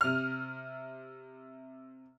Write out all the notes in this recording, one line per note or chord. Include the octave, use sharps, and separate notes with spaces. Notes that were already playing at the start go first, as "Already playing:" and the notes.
C3 F6